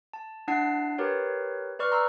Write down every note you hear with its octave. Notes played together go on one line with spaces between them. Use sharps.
A5
D4 E4 F#5 A5 C7
G4 A#4 B4 C#5
B4 D5 C#6 F6
A#5 C6 E6